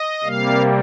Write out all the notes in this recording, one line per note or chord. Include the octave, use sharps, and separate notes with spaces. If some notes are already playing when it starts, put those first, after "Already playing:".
Already playing: D#5
C3 G3 A#3 F5